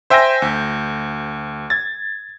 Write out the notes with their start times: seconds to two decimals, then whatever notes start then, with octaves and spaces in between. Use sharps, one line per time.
0.10 C5 E5 G5 G#5 G6 A#6
0.42 D2
1.70 G#6 A6